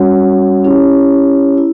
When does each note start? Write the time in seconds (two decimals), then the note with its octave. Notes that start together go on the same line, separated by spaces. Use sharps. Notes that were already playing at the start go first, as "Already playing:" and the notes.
Already playing: G3 C#4 F#4 C#5 F#5
0.64 C#4 E4 G4 C#5
1.58 E4